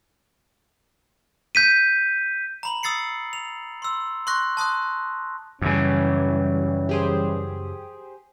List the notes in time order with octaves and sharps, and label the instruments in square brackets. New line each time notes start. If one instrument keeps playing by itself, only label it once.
[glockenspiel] G6 B6 D#7
A#5 B5 F#7
D#6 E6 A6 C7 C#7
F7
C6 E6
C6 C#6 F#6 A#6
A5 C6 D#6 F#6
[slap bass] F#2 C#3 [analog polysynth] E3 G3 [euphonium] C#4
[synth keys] G4 G#4 C5